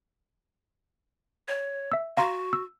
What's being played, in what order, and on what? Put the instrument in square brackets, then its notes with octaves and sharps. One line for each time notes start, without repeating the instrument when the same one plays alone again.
[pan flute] C#5
[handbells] E5 E6
[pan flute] F#4 [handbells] F5 A#5 C6
[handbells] E6